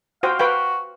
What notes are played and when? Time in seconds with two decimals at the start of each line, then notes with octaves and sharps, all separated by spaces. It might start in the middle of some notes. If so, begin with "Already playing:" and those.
0.23 F#4 C5 F5 G5
0.39 F#4 B4 F5 G5